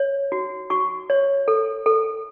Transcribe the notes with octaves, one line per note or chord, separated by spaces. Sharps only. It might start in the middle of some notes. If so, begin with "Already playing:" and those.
Already playing: C#5
F#4
F#4 C#6
C#5
A4
A4